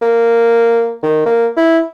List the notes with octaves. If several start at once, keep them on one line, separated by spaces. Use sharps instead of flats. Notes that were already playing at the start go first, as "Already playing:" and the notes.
A#3
D#3
A#3
E4